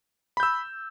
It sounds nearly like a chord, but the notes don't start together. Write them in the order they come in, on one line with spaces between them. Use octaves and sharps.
B5 G6 E6